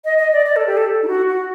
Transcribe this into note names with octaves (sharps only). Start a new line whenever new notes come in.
D#5
D#5
D5
D5
A4
G4
A4
D#4
F#4
F#4